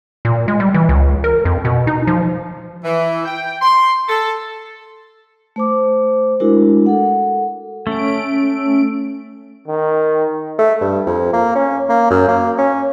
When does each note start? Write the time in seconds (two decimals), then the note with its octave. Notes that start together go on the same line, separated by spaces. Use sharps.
0.25 A#2
0.48 G#3
0.60 G3
0.74 E3
0.89 C#2
1.24 A#4
1.45 F2
1.65 B2
1.87 D#4
2.07 F3
2.85 E3
3.25 G5
3.62 C6
4.09 A4
5.56 A3 C5 D6
6.40 G#3 D4 E4 F#4 A#4
6.86 A4 F#5
7.87 A3 C#4 D7
9.67 D#3
10.59 A3
10.81 G2
11.07 F2
11.33 A#3
11.55 C#4
11.89 A#3
12.11 F#2
12.28 A#3
12.58 C#4